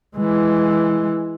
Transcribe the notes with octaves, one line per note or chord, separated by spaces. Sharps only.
E3 G#3